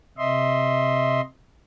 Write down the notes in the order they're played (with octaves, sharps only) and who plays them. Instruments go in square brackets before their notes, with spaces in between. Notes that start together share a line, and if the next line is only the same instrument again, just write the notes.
[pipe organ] C3 D#5 E5 C6